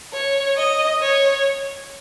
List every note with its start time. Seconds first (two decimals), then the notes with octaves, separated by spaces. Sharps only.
0.13 C#5
0.57 D#5
1.01 C#5